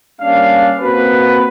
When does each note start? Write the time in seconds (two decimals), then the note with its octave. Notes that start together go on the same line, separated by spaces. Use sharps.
0.20 G3 A#3 C#4 D4 F5
0.80 A#3 C4 F#4 B4